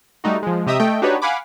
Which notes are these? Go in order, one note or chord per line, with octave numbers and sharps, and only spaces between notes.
G3 A3 D#4 F#4
F3 G#3
C3 G4 D#5 E5 A#5 D#6
A3 D#5 G5
D4 D#4 F#4 G4 B4 C#5
F5 F#5 G#5 B5 D6